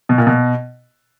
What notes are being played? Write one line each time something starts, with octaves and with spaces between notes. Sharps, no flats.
B2
A#2
B2